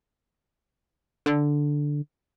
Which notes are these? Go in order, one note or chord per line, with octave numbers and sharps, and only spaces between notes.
D3